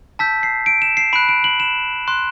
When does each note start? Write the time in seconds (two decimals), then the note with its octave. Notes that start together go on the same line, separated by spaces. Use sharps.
0.19 A5 E6 G6 B6
0.43 C7
0.66 D7
0.82 E7
0.97 C7
1.13 B5 F#6 D7
1.29 D7
1.44 F#7
1.60 E7
2.08 C6 F#6